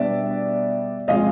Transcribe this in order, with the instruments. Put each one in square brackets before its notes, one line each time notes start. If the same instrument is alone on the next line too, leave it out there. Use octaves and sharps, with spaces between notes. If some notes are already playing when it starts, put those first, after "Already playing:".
Already playing: [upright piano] B2 G3 B3 D4 [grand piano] D5 E5
[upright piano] C3 F3 G#3 C#4 [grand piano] D#5 F5